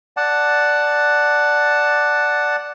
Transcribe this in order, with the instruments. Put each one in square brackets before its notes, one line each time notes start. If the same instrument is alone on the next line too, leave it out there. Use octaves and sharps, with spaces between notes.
[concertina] D5 F#5 A5